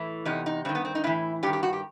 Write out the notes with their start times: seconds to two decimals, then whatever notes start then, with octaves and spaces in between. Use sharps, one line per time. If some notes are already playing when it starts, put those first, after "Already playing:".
Already playing: A2 E3
0.25 E2 C3 D#4
0.46 D#4
0.65 G2 C4
0.69 D#3
0.75 B3
0.85 C4
0.95 D#4
1.04 A2 E3 E4
1.43 G2 G4
1.46 D#3
1.53 G4
1.63 F#4
1.73 G4